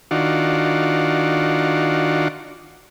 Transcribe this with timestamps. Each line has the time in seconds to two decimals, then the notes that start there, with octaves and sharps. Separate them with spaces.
0.11 D#3 D4 F4 F#4